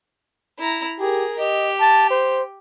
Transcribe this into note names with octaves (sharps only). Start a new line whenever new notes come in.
E4 A#5
G4 G#4 A#4
G4 D#5
A5
C5